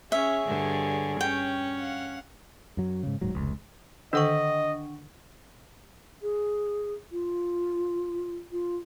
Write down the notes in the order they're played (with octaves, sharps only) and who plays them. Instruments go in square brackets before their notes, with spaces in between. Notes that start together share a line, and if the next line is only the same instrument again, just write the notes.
[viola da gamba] C#4 [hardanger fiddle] G#4 C#5 [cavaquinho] E5
[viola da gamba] G2 D3
[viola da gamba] C#4 [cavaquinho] G5
[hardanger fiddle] F5 F#5
[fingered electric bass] F#2 F#3
G#2 C#3
D#1 G#2 F#3
F1 C#2
[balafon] D3 D#3 A4 [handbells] D4 F#5 C#6 [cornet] D#5
[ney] G#4
F4
F4